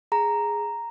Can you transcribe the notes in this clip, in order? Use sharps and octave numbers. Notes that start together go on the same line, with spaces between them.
G#4 A#5